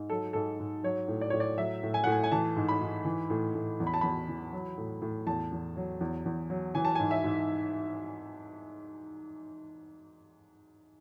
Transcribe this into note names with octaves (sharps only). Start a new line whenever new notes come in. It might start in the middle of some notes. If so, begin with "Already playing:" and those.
Already playing: G#2
F#3 A4
G#2 A4
G#2
F#3 C#5
A2
D5
A2 C#5
D5
F#3 E5
A2
G#5
A2 F#5
G#5
G#5
E3 A5
G#2
B5
G#2
E3
A2
A2
E2
B5
A5
E2 B5
E3
F#3
A2
A2
E2 A5
E2
F#3
E2
E2
F#3
E3 G#5
A5
G#2 G#5
E5
G#2